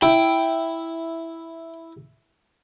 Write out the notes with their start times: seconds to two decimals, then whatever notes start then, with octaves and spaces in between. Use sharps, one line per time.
0.02 E4 G5